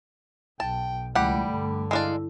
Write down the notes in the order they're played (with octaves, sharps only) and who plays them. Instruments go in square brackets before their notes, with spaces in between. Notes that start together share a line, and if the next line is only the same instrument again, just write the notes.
[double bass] B1 [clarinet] G5 [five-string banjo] A5
[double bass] C#2 E3 [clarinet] G3 [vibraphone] A3 B5 [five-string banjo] G4 F#5
[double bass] G2 D3
[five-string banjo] G#3 D4 D5 [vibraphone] E4 [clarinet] F5